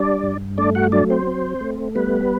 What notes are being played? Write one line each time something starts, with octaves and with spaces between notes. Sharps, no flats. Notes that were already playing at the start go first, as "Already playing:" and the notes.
Already playing: G3 D4 D5
G2
A3 D4 D5
F#4 F#5
F#3 D4 D5
C4 C5
C4
A3
G3 B3 B4